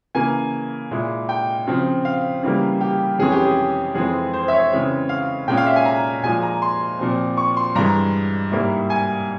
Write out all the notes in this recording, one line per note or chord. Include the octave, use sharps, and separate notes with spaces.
C#3 E3 A#3 G#5
A#2 G#3 E4
G5
C#3 F3 C4
F5
C#3 E3 G3 A#3
G4
F2 E3 G#3 C#4 G#4
G4
G#4
F2 E3 G#3 C4 G#4
C5
E5
C#5
C#3 E3 G#3 C4
F5
A#2 G#3 C#4 G5
F5
E5
G#5
A#5
A#2 F3 G#3 G#5
A#5
C6
A#2 F3 C4
C#6
C6
G2 E3 G#3 A#5
G#2 G3 A#3 E4
G#5